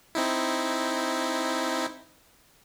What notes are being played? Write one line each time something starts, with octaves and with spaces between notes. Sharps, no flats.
C4 D#4 E4